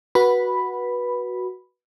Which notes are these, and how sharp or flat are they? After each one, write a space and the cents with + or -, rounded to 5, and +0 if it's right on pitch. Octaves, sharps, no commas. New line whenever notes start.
F#4 +0 B4 -20 B5 +0